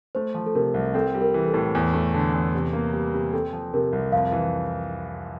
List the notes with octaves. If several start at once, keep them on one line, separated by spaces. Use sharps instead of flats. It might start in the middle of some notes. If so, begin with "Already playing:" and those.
A3 C5
F3
A4
C3 A#4
C2
C4 A4
G3
A#4
E3
A4
A2
E2
A3
D3
E2
C3
A#3
G3
C3
C4 A4
F3
C3 A#4
C2
F2 F5
E3